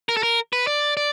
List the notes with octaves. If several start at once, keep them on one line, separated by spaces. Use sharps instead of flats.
A#4
A4
A#4
B4
D5
D5